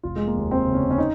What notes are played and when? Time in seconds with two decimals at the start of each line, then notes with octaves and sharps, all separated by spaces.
0.03 F1 F4
0.16 G#3
0.27 A#3
0.36 D#2
0.51 C4
0.67 C#3
0.74 C#4
0.91 C#4
0.98 D#4